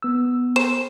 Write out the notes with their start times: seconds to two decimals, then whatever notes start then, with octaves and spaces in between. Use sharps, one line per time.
0.02 B3 E6
0.56 C5 E7